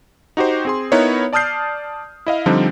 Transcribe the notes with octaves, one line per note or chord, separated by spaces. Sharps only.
D#4 F#4 G4 C5
C4 G#4 C6
B3 D#4 E4 A#4 B4 C#5
D5 A5 D#6 F6 G6 C7
E4 D#5 F5
D3 F3 G3 C4 D4 D#4